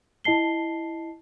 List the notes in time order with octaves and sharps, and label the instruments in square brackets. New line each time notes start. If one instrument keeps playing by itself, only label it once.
[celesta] E4 D#5 A5 C7 G7